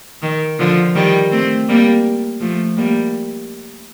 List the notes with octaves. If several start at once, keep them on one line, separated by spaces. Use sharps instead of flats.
D#3
D3 F3
D#3 G3
A3 C4
G3 A#3
F3 A3
G3 A#3